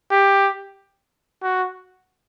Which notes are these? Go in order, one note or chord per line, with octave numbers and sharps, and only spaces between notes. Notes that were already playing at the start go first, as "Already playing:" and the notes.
G4
F#4